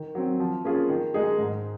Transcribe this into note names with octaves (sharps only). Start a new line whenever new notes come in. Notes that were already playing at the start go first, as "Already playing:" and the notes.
Already playing: D#3
F#3 C4
F3
A#3 C#4 F4 G#4
D#3
G#3 D#4 G#4
G#2